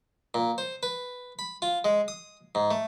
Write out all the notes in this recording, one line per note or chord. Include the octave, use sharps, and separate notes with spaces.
A#2
C5
B4
B5
F4
G#3
D#6
G#2
A3